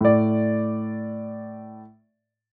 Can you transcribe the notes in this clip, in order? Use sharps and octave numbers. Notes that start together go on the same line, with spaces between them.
A2 D5